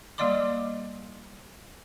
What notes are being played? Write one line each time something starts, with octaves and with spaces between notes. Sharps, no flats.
G3 A#3 D5 D#5 C6 D6